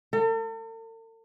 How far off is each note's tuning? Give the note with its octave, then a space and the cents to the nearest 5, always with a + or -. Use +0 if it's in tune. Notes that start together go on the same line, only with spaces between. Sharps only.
A4 +45